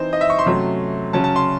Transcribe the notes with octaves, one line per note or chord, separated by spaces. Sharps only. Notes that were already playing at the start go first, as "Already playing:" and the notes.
Already playing: E3 C4 D#4 C5
D#5
E5
C#6
C6
C3 F#3 A3 C#4
C#3 F#3 C#4 A5
A5
C6